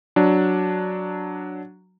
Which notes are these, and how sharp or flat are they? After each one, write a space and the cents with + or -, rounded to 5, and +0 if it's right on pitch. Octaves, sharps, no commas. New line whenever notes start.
F#3 +0 D4 +0